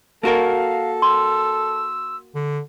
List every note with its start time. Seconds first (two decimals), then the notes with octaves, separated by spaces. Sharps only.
0.23 A#3 F#4 A4 A#4 F5
1.02 C6 E6
2.35 D3